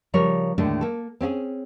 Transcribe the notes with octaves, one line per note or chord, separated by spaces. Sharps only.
C#3 F3 G3 A#4 C#5
D#2 A2 D3 G#3 A3 D4
A#3 A4
C4 C#4 F4 G#4